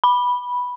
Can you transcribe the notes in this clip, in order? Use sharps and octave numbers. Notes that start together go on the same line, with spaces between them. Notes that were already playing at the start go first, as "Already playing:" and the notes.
B5